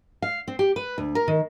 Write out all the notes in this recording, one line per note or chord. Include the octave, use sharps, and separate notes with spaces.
F5
C4
G4
B4
D2
A#4
D#3